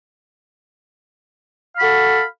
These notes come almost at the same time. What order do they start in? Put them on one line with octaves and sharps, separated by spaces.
F5 B5 F#4 A4